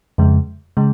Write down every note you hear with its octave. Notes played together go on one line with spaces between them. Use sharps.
F2 C#3 G#3
C#3 G#3